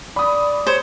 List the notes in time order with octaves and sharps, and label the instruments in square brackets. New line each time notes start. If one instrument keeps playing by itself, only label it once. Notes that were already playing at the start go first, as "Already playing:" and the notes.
[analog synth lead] D5 [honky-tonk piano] B5 D#6
[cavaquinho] C5 [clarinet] C#5